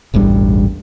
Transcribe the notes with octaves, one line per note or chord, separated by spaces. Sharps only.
E1 A1 G2 G3